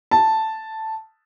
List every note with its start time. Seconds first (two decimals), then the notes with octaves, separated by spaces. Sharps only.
0.11 A5